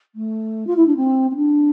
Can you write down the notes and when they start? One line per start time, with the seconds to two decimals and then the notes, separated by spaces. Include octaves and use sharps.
0.15 A3
0.67 F4
0.76 E4
0.87 D4
0.96 C4
1.31 C4
1.36 D4